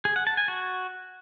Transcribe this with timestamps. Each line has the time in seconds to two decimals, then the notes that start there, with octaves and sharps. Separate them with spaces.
0.05 G#4
0.16 F#5
0.27 A5
0.37 G#5
0.48 F#4